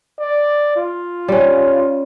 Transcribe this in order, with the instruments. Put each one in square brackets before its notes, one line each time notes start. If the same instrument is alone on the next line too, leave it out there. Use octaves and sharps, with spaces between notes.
[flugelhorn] D5
F4
[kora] G3 C#4